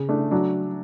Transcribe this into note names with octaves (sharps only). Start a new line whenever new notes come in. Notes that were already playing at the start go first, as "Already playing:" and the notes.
Already playing: C#3
A3 D4
F#3 D4